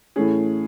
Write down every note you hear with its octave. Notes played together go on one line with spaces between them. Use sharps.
A2 E3 A3 C#4 G#4